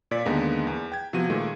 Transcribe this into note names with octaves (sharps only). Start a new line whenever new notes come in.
A#2 D5 B6
D#2 D3 G#3 A#3 B3 D#4
E2
G5 G#6
C3 F3 B3 F#4 D#7
A#2 D#3 G#3 A3